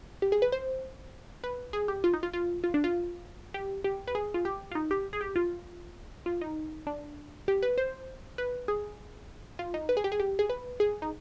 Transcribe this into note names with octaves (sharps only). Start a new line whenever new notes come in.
G4
G#4
B4
C5
B4
G#4
G4
F4
D#4
F4
F4
F4
D4
F4
G4
G4
B4
G#4
F4
G4
F4
D#4
G4
G#4
G4
F4
F4
D#4
D4
G4
B4
C5
B4
G#4
F4
D#4
B4
G#4
G4
G#4
G4
G#4
B4
G#4
D#4